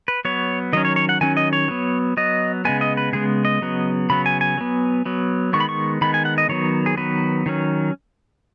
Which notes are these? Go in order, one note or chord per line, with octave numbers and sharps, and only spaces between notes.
B4
F#3 B3 C#5
D#3 F#3 C#4 D#5
C#5
C#5
F#5
D#3 F#3 C#4 G#5
D#5
C#5
F#3 B3
F#3 B3 D#5
C#3 G#3 B3 G#5
D#5
B4
C#3 G#3 B3 G#4
D#5
C#3 F#3 B3
C#3 F#3 B3 B5
G#5
G#5
F#3 B3
F#3 B3
D#3 G#3 B3 C#6
B5
C#6
D#3 G#3 B3 B5
G#5
F#5
D#5
D#3 F#3 B3 C#5
G#4
D#3 F#3 B3 B4
D#3 F#3 C#4